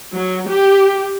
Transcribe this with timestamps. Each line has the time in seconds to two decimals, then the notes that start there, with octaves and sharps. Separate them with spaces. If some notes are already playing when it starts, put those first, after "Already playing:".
0.15 F#3
0.49 G4